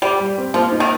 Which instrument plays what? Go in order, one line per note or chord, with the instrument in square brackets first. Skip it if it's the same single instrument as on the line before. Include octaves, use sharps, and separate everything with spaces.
[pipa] G3 [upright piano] G4
[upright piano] G3
C4
[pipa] F3 [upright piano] A#3
[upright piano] D#4
[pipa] D#3